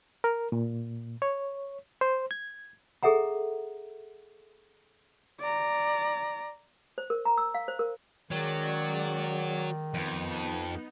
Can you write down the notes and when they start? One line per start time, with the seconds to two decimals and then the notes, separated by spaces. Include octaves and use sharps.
0.24 A#4
0.52 A#2
1.22 C#5
2.01 C5
2.31 G#6
3.03 G#4 A4 E5 F#5 A#5
5.41 D5 A#5
6.98 C5
7.10 A#4
7.25 A#5
7.38 E6
7.54 F5
7.68 C5
7.79 A#4
8.31 D#3 F#3 G#3 C#4 D5
9.94 F2 B3 D#4